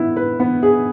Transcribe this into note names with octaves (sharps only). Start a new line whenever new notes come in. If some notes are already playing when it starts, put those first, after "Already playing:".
Already playing: B3 E4
B4
B3
G#4